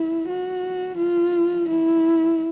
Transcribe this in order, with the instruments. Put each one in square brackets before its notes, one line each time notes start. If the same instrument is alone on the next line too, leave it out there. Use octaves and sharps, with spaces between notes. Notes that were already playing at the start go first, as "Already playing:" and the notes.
Already playing: [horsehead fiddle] E4
F#4
F4
E4